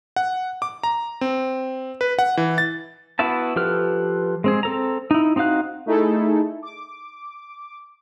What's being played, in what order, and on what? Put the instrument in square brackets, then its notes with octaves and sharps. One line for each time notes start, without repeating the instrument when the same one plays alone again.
[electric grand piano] F#5
D6
A#5
C4
B4
F#5
E3
A6
[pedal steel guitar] B3 E4 F#4 E5 A5
F3 G4 A4 B4 F6
G#3 C4 G#4
C4 A4 A#5
D#4 E4
C4 D#4 F#4 F5 F#6
[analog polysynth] A3 D#4 E4 G#4 A4
D6